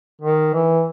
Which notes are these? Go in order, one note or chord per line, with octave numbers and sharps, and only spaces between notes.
D#3
E3